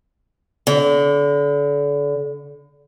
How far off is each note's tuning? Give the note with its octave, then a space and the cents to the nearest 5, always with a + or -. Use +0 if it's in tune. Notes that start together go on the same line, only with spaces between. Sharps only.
D3 -35